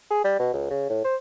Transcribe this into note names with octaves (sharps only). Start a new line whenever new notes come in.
G#4
G3
B2
C#2
C#3
A2
C5